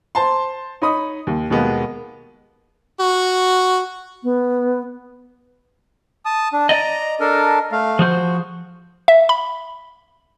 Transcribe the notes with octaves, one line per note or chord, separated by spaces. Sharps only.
C5 A5 C6
D#4 C#5 B5 D#6
D#2
D#2 B2 G#3 A#3 B3
F#4
B3
A5 D#6
D4
D5 D#5 A#5
D4 A4 A#4
A3 F5
F3 F#4 G#4 C5
E5
B5